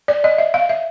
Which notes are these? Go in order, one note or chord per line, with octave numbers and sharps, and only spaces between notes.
D5
D#5
E5
F5
E5